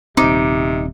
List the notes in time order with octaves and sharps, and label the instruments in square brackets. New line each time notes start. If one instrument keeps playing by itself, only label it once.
[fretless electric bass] D#1 C4 [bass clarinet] C3 [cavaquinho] D#4 D6